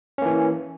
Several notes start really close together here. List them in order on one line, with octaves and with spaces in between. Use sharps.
C#4 A#3 E3